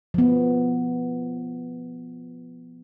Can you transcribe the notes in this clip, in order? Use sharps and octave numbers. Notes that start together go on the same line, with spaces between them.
F3 B3